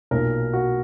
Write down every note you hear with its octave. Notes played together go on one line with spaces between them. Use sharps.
B1 A#2 F#3 A#3 A#4
F#4